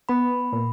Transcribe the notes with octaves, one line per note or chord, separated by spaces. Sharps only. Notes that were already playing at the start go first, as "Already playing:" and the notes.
B3 B5
A#2